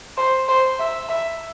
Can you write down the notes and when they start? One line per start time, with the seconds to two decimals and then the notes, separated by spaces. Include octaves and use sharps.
0.17 C5
0.49 C5
0.79 E5
1.09 E5